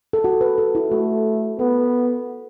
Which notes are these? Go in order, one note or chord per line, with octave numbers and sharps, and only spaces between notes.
A4
F#4
B4
A4
E4
A3 F#4
B3 A4